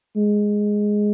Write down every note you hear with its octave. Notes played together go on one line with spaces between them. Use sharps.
G#3